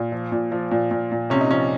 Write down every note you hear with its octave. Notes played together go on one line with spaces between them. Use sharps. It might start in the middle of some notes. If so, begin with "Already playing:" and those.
Already playing: A#2
F3
A#2
F3
A#2
A#2
A#2
C3 C#4
D#4
F3 C#4